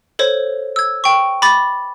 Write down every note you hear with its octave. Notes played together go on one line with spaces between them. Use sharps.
A4 C5 C#5
E6 G#6
G5 C#6
B5 D6 A6